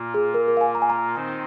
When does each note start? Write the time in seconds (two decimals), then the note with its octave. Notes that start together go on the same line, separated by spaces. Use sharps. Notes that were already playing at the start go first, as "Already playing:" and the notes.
Already playing: A#2 A#3 F4
0.14 G#4
0.34 A#4
0.48 A#4
0.57 F5
0.61 G#5
0.75 A#5
0.82 G#5
0.90 A#5
1.15 D#3 C4 D#4 C5